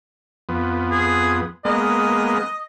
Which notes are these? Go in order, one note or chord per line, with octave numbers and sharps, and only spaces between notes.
F2 B3
G#4
G#3 A#3 B3 D#5